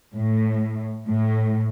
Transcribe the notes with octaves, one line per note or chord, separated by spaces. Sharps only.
A2
A2